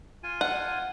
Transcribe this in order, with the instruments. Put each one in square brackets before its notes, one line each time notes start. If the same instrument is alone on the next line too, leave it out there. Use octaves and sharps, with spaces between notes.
[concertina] F4 G#5
[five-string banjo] F#5